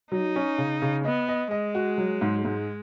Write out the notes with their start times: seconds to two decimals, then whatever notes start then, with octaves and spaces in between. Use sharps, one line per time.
0.12 F#3 D#4
0.36 C#4
0.58 C#3
0.82 C#3
1.05 B3 D#5
1.28 D#5
1.51 G#3 D#5
1.75 F#4
1.98 F#3
2.21 G#2
2.45 G#2 G#3